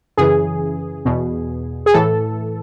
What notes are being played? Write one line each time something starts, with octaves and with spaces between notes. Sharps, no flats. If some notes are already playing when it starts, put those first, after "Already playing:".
F#2 C#3 E3 G#4
E2 B2
G#4
A2 E3 A4